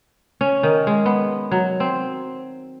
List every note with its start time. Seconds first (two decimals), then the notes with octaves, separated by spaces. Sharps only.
0.41 C#4
0.63 D#3
0.87 G#3
1.06 B3
1.51 F#3
1.80 C4